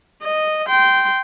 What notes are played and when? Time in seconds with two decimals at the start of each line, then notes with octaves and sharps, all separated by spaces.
0.22 D#5
0.68 G5 C6